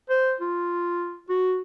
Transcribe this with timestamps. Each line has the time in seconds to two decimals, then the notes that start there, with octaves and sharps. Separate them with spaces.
0.10 C5
0.41 F4
1.29 F#4